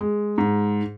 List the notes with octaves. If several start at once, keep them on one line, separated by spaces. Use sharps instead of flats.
G#3
G#2